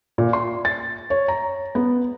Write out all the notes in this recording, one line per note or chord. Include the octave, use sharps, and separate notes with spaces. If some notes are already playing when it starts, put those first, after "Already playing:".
A#2
C6
A6
C#5
A#5
B3